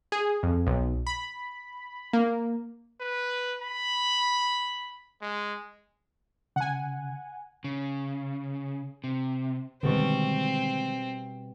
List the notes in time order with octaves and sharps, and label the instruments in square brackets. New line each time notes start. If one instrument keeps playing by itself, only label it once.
[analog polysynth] G#4
F2
B1
B5
A#3
[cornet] B4
B5
G#3
[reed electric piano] C#3 [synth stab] F#5 G#5
[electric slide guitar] C#3
C3
[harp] B2 G3 C#6 [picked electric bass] D3 D#3 G#3 [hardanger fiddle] C4